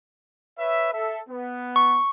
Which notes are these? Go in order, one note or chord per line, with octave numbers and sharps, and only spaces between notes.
B4 C#5 E5
A4 E5
B3
C#6